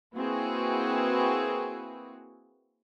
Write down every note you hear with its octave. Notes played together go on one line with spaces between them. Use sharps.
A#3 C4 E4 F#4 G#4 B4